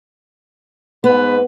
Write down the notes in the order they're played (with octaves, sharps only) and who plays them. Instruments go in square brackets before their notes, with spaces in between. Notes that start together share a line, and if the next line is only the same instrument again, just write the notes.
[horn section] G#2 B4 [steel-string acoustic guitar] B3